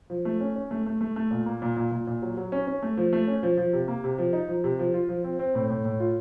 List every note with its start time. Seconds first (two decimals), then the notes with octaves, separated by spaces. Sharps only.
0.10 F3
0.25 A3
0.40 C#4
0.56 C#4
0.71 A3
0.86 A3
1.01 A3
1.16 A3
1.31 A#2
1.46 A#3
1.62 A#2
1.76 A#2
1.91 A#2
2.07 A#2
2.22 F#3
2.37 F#3
2.52 C#4
2.67 C#4
2.82 A3
2.97 F3
3.13 A3
3.28 C#4
3.43 F3
3.57 F3
3.73 C3
3.88 A#3
4.04 C3
4.18 F3
4.33 D#4
4.49 F3
4.64 C3
4.79 F3
4.94 F4
5.09 F3
5.24 C4
5.39 C4
5.55 A2
5.70 A2
5.85 A2
6.00 F4